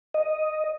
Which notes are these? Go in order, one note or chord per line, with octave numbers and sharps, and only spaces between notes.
D#5